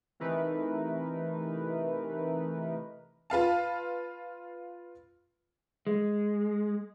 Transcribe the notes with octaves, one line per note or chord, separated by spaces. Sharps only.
C3 E3 A3 D#4 A#4 B4
F4 B4 F5 A5
G#3